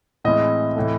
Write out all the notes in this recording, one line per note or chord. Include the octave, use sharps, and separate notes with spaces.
A2 E3 G#3 C4 D#5
A2 E3 A3